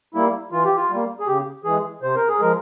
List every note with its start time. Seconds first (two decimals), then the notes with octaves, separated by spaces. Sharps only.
0.14 G3 A#3 E4
0.52 E3 F4
0.64 G4
0.76 F4
0.90 G3 A#3
1.20 G#4
1.27 C#3 G4
1.65 E3 G#3 G#4
2.02 C3 C5
2.16 A#4
2.28 G#4
2.39 F3 G#3 A#4